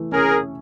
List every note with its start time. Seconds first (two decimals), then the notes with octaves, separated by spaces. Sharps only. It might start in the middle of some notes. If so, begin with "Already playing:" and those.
Already playing: E3 A3
0.12 C#4 G#4 A#4